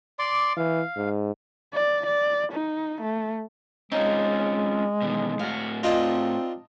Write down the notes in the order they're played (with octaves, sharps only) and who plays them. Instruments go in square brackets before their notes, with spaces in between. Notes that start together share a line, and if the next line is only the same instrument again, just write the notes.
[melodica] D5 C6 D6
[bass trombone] E3 [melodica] F5
[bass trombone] G#2
[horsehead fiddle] D5
D5
D#4
A3
[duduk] G#3 [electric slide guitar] C4 C#4 F4 [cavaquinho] D#4 D6
[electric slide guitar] B2 D#3 E3
[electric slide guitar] A2 F#4 [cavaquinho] F5
[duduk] C4 [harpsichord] D4 D#4 F4 [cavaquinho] D#5 A5